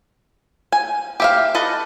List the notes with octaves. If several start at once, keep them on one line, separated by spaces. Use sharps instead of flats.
G#5
G4 E5 F5
A4 B4 D#5